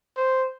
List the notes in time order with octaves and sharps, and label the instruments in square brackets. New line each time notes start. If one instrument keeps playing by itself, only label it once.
[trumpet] C5